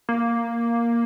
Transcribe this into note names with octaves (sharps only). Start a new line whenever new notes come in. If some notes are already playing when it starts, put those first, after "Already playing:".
A#3